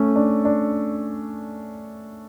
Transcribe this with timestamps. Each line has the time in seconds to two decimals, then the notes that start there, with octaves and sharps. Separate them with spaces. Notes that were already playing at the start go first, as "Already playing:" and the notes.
Already playing: A3 C#4
0.16 D4
0.45 D4